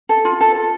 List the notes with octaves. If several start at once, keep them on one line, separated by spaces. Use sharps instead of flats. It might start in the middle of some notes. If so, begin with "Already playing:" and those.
A4
F4
A4
A4